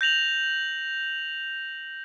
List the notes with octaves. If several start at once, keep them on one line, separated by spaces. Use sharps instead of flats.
G6 A#6 F7 F#7